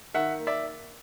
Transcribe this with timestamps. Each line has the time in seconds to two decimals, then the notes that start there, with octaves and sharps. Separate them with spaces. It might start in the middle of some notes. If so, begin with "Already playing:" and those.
0.14 D#3 E5 F#5
0.39 A#3
0.47 D5 E5